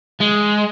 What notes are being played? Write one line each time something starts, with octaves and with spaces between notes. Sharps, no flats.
G#3